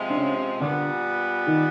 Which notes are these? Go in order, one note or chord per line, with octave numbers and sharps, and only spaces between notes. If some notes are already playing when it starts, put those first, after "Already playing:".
Already playing: C3 F3 G#3
D4
C#3 C#4
A#2 D3 G3 B3 D4
D#3 D#4